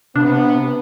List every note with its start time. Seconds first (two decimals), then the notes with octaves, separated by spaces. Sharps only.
0.16 C3 B3 D4